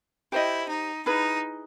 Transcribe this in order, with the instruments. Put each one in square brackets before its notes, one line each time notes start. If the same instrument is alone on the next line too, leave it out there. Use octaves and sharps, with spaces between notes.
[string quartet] E4 [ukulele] G4 C5 D#5
[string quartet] D#4
[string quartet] D#4 [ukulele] E4 G#4 B4